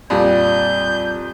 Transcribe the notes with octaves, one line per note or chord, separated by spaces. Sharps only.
F2 A#2 G3 G6